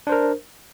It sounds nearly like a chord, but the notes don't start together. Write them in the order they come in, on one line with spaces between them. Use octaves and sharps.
D4 C5 A#4